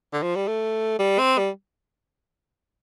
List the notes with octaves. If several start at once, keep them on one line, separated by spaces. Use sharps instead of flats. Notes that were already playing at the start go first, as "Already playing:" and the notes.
D3
F3
G3
A3
G3
C4
G3